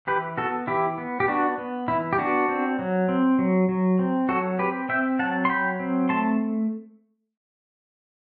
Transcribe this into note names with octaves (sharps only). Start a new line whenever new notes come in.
E3 G4 B4
B3 F#4 A4
E3 E4 G4
B3
G4
B3 D4 F#4
B3
E3 E4
G4
B3 D4 F#4
C4
F#3
C4
F#3
F#3
C4
F#3 F#4 A4
C4 G4 B4
C4 E5 G5
F#3 F#5 A5
C6
F#3 G5 B5
C4
A3 A5 C6